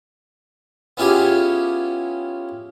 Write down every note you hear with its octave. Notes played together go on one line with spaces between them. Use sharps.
B3 C#4 E4 F4 G4 G#4